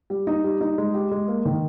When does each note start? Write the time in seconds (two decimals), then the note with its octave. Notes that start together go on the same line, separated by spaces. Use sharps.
0.10 G3
0.27 D#4
0.44 G3
0.61 D#4
0.78 G#3
0.94 G4
1.12 G#3
1.28 A#3
1.45 D#3